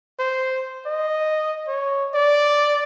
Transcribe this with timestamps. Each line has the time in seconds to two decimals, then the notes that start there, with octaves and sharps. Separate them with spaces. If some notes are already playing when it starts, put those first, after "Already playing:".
0.20 C5
0.86 D#5
1.68 C#5
2.14 D5